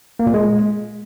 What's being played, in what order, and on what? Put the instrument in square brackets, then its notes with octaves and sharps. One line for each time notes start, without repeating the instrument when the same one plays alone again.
[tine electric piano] A#3
A#2
G#3